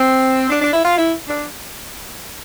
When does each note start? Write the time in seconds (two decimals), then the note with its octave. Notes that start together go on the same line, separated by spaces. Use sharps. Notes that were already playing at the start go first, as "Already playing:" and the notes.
Already playing: C4
0.50 D4
0.62 D4
0.73 E4
0.84 F4
0.97 E4
1.28 D4